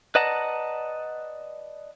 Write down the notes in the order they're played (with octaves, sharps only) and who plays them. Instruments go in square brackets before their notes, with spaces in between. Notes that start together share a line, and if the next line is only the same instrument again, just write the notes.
[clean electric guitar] B4 D5 D#5 F#5 A5 A#5